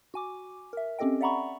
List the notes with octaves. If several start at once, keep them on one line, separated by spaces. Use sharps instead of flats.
F#4 G#5 D6
A#4 E5
C4 C#4 G4 A4 D#5 G5
D5 E5 F#5 A#5 B5 C#6